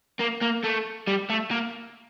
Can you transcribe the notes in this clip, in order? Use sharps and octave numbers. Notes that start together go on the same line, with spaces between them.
A#3
A#3
A3
G3
A3
A#3